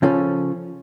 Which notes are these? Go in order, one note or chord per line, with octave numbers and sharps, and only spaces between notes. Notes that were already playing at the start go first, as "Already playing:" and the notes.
C#3 F3 C#4 A4